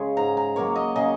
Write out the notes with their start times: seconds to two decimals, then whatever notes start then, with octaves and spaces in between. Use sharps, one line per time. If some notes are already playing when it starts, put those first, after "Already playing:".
Already playing: C#3 G#3
0.17 G#2 A#5
0.37 A#5
0.56 F#3 A#3 C#5
0.76 D#5
0.96 C#3 D#5